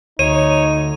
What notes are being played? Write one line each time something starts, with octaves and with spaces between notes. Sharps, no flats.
D2 D#4 C#5 D#7